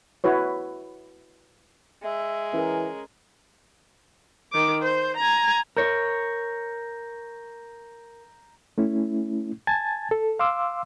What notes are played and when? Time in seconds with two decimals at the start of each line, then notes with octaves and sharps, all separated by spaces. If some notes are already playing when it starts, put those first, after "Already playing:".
0.24 E4 F#4 B4 C#5
2.03 G#3 E5
2.53 E3 C#4 G#4 A#4
4.52 D#3 D6
4.82 C5
5.17 G#5 A#5
5.77 A#4 C#5 A#5 G6 A#6
8.78 A3 C#4 E4
9.67 G#5 A5 G#6 A6
10.11 A4
10.39 F5 C6 D6 E6